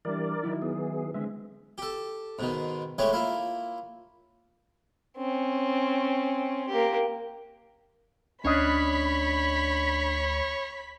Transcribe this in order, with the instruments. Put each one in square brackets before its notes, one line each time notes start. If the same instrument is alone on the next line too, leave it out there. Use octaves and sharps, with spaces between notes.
[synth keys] E3 G3 D4 [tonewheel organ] A#4 D5
[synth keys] D#3 F#3 E4
[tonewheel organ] B3 G#4
[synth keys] D3 G#3 C4 [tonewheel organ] E5
[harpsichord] G4 A4
G#2 B2 D#3
E3 G#3 A3 G4 C#5
A#3 E4 F4
[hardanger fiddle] C4 C#4
A#3 G4
[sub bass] D2 [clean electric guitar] C#4 D4 D#5 [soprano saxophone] C#5 [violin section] B5 B6